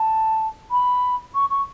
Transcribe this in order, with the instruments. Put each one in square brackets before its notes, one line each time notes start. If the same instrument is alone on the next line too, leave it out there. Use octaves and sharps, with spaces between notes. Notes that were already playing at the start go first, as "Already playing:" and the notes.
Already playing: [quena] A5
B5
C#6
C#6